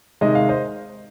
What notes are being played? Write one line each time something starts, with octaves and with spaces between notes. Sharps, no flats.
C3 D#3 G#3 D#5
F5
C5 D#5